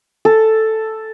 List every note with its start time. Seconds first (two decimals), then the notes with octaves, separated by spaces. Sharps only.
0.25 A4